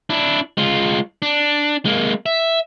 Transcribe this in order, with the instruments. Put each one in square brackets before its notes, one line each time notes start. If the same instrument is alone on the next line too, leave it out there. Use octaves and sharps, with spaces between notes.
[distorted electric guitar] D4 E4
G#3 F4
D4
G#3 A#3
E5